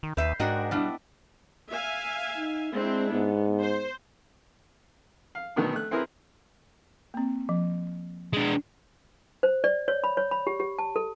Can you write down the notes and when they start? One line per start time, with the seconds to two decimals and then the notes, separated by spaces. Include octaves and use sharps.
0.03 D#3
0.17 D#2 B4 E5 G6 C7
0.39 G#2 D4 F#4 A#4 D#5 F#5 G5
0.71 B2 G3 B3 D4 E4
1.69 E5 F5 G#5
2.37 D#4
2.73 G#3 C4 D4 E4
3.12 G#2 B3
3.61 C5
5.35 F5
5.56 B2 D3 D#3 F#3 A3 B3
5.73 A3 F#6
5.91 C4 E4 G#4 A#4 B4
7.14 A#3 C4
7.49 F3
8.33 G#3 D4
9.43 C5
9.64 D5
9.88 C#5
10.04 B5
10.17 C#5
10.31 B5
10.47 G4
10.60 G4
10.79 A5
10.96 A4